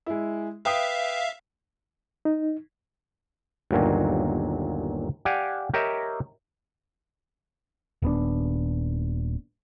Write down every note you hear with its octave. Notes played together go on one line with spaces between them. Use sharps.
G#3 E4
B4 E5 F5 G5 D#6
D#4
G1 D#2 A#2 F#3
G4 D5 F5 F#5 G#5
G4 A#4 C#5 D#5 E5 G5
D#1 B3 D4